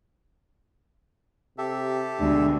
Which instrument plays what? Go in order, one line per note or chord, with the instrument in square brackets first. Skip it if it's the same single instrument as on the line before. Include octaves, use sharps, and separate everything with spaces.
[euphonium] C3 [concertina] G4 A4 E5
[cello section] D2 B2 G#3 [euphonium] D4